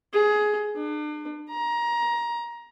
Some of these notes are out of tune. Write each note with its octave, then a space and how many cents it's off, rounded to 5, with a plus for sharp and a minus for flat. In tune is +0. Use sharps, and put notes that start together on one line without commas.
G#4 +15
D4 +40
A#5 +20